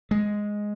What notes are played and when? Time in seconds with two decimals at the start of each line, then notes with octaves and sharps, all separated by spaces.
0.11 G#3